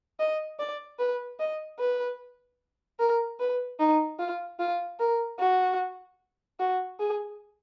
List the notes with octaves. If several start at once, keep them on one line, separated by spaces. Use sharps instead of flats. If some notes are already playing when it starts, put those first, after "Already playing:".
D#5
D5
B4
D#5
B4
A#4
B4
D#4
F4
F4
A#4
F#4
F#4
G#4